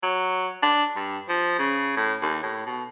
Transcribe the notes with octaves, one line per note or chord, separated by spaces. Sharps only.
F#3
D4
G2
F3
C#3
A2
D#2
A2
B2